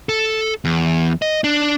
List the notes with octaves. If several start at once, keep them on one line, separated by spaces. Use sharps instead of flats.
A4
E2
D#5
D4